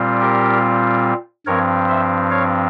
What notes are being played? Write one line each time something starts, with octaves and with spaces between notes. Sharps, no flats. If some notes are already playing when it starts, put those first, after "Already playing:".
Already playing: A#2 G3 C4 F4
G4 A#4
G2 F3 C4 A#4 C#5
C5 E5
C#5 F5